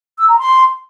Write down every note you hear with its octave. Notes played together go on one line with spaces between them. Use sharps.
E6
A#5
C6